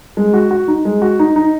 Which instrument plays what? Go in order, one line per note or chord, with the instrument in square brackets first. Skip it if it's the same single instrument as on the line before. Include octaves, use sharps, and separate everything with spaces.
[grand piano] G#3
F#4
F#4
D#4
G#3
F#4
D#4
D#4